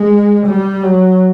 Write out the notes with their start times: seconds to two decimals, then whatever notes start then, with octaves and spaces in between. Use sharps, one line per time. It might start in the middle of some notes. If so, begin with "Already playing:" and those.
Already playing: G#3
0.46 G3
0.83 F#3